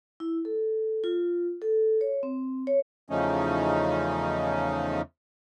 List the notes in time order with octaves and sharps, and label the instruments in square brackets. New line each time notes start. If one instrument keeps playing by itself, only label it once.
[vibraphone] E4
A4
F4
A4
C#5
C4
C#5
[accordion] E2 C#3 F3 A3 C#4 D#4